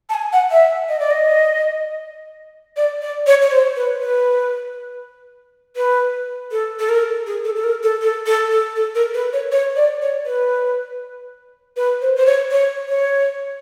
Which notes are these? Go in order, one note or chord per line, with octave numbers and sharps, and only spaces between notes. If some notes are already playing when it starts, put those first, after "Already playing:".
A5
G#5
F#5
E5
D#5
D5
D#5
D5
D5
C#5
C#5
C5
B4
B4
B4
A4
A4
A#4
G#4
A4
A4
A#4
A4
A4
A4
A4
A4
A#4
B4
C#5
C#5
D5
C#5
B4
B4
C5
C5
C#5
C#5
C#5